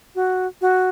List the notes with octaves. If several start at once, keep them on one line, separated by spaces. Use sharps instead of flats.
F#4
F#4